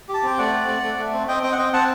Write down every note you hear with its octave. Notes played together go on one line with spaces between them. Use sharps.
G4
A5
C4 G5
A3 D5 F#5
C4
A3
A3
A3
C4
C4 D#5 G5
C4 D#5 G5
F#5
C4 D#5 G5
C4 F#5 A5